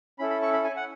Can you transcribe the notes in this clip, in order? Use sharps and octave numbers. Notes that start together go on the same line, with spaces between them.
C#4 E4 A4 B5
B5
C#6
B5
G#5
F#5